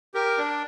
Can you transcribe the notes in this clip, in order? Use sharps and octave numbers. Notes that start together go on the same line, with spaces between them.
G4 A#4
D4